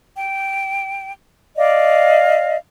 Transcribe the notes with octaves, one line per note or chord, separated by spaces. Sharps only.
G5
D5 D#5 F5